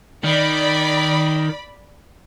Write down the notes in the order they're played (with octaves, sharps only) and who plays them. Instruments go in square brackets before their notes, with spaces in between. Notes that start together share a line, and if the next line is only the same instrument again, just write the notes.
[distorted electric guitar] D#3 [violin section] D5 B5